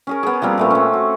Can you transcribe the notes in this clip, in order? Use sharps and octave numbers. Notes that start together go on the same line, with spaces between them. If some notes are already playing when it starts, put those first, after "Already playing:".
C#4 G#4 A#4
B3 G#4
F3 G3 A#3 C4
A#2 A3 B3
C4 C#4
F#4